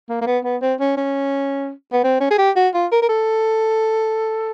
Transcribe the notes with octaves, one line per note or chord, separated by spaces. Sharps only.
A#3
A#3
B3
B3
C4
C#4
C#4
B3
C4
C#4
G#4
G4
F#4
F4
A#4
A#4
A4